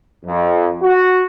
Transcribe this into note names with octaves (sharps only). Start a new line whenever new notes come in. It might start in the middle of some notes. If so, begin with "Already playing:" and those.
F2
F#4